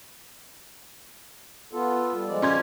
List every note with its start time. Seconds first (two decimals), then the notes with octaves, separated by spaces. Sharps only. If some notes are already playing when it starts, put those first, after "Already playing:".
1.73 B3 F4 A4
2.13 G3
2.27 F3 G#3 D5
2.42 C#4 C6 G#6